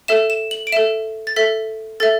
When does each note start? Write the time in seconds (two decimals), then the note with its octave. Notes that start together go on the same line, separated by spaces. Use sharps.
0.08 A4 E5 E7
0.30 E7
0.51 F#7
0.67 D7
0.72 A4 E5 E7
1.27 A6
1.36 A4 E5 B6
2.00 A4 E5 A6